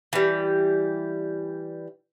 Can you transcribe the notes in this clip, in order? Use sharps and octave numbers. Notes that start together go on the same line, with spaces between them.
E3 G3